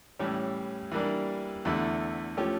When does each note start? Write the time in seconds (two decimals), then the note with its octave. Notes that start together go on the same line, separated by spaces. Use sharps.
0.19 A2 E3 G3 C#4
0.92 E3 G3 A#3 D4
1.65 E2 D3 A3 E4
2.37 F3 A3 C#4 G4